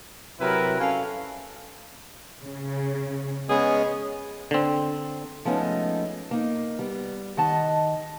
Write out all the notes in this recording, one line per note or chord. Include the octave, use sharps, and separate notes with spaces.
C3 F#3 E4 A#4 B4
C#4 A4 F5
C#3
G#3 B3 C#4 G#4
D3 C4
F3 G#3 A3 B3 C#4 D#4
A#3 D#4
G3 B3
D#3 D#5 F#5 A5